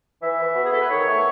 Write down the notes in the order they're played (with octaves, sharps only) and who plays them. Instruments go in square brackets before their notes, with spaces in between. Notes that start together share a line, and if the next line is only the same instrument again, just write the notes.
[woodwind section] E3 E5
E3
B3 F#4
G#4
B3 A4
B4
D#3 C#5
A3